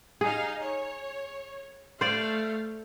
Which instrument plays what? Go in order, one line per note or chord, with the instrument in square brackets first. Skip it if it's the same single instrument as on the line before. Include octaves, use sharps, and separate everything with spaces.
[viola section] D#4 F5 [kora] G#4
[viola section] C#5
[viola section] A3 F5 [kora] C5 D5